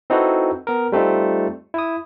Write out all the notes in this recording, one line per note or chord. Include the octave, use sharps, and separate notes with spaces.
C4 D#4 E4 F#4 A4 B4
B3 A#4
G3 A3 C4 D#4 F4
E4 D#6